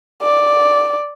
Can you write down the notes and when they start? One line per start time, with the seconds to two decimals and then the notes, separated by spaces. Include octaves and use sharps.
0.23 D5